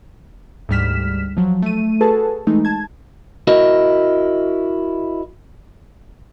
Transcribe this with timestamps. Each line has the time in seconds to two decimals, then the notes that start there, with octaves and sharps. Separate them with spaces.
0.69 D2 G#2 G3 F6 B6 E7
1.37 F3 F#3
1.63 A3 D#7
2.01 F#4 G#4 A4 B4 A5
2.47 E3 G#3 A3 D#4
2.65 A5 G#6
3.47 E4 F#4 A#4 D#5